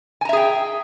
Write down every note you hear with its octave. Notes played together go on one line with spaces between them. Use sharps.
G#4 E5 G5 G#5 A#5